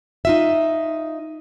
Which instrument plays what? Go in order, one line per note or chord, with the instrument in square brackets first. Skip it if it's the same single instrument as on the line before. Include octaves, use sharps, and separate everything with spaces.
[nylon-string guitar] D#4 F4 E5